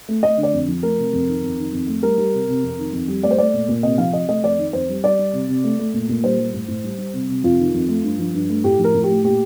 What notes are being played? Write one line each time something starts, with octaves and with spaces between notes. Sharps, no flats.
A3
A3 D#5
D3
D5
F2
F3
A3 A#4
C3
F2
D#3
F2
D#3
F2
A3
G3 A#4
G3
C3
C3
F2
D#3
F2
G3
A3 D5
C5
A3 D5
A#2
A#2
C3 D#5
F3 F5
C3 D#5
A3 D#5
F2 D5
D#3
F2 C5
G3
G3 D5
G3
C3
C3
A3
A3
A#2
A#2
G3 C5
G3
A2
A2
G3
G3
C3
C3
F2 F4
D#3
F2
A3
G2
F3
G2
A3
A2 G4
F3
A#4
A2
G4
A3
A#2 G4